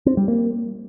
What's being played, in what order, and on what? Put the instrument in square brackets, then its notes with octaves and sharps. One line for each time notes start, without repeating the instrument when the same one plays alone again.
[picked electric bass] C4
G3
A#3